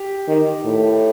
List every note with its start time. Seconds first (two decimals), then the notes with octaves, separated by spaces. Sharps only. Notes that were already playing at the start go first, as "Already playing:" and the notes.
Already playing: G4
0.28 D#3
0.65 A2